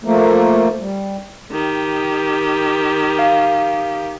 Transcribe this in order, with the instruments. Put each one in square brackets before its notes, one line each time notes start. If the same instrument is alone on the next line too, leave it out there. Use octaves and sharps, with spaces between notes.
[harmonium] F3 A3 A#3
G3
[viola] D#3 G4
[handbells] F5